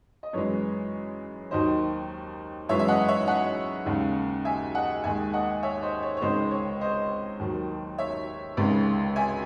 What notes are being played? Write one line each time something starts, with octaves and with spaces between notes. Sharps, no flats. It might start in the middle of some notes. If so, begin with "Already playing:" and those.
D#5
F#2 E3 G#3 C#5
D#2 D#3 F#3 C5 D#5
F#2 E3 G#3 C#5 E5
E5
D#5 F#5
C#5 E5
D#5 F#5
D#2 C#3 G#3
E5 G#5
D#5 F#5
D#2 D#3 G#3 E5 G#5
D#5 F#5
C#5 E5
C5 D#5
C#5
C#5
C#2 C3 D#3 G#3 C5 D#5
C#5
C5 D#5
D#2 D#3 F#3
C#5 E5
C#2 C3 D#3 G#3
E5 G#5